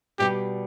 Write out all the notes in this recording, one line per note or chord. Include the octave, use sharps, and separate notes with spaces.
B2 G3 D4 G4